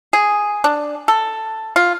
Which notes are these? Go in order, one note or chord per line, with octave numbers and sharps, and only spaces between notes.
G#4
D4
A4
F4